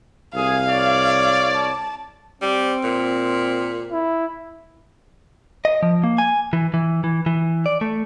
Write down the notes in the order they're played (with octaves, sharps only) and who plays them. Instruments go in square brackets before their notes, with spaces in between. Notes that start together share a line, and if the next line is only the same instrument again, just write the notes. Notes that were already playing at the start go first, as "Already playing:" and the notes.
[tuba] C2 [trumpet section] G#4 [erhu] F5
[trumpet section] C#5 D5
[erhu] A5
[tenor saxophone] G3 [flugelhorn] C4
[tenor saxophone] A#2
[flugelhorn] E4
[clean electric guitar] D#5
F3
A#3
G#5
E3
E3
E3
E3
D5
A3